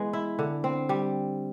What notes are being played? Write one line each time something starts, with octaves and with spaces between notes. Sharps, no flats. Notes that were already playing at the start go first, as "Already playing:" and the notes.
Already playing: E3 G#3 B3
E4
D3
C4
G3